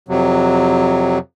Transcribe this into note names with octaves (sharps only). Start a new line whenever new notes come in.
F2 C3 F#3